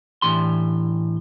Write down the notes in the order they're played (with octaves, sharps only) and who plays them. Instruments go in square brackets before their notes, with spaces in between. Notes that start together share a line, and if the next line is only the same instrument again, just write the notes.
[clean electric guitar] A2 E3 D4 G4 C6